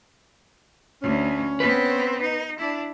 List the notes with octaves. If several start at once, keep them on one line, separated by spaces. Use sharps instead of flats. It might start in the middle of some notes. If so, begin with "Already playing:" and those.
D2 C#4
B3 C4 B4
D#4
D4 E4